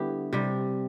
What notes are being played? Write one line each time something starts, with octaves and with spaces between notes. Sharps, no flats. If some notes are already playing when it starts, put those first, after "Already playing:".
Already playing: D3 G3 B3 E4 G4
C3 G3